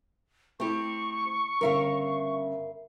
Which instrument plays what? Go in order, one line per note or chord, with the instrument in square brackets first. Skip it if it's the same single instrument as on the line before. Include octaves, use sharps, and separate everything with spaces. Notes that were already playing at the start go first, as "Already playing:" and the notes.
[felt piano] A3 E4 [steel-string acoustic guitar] C4 G4 [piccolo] C#6
[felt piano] G1 C#3 [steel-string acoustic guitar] A#4 E5 F5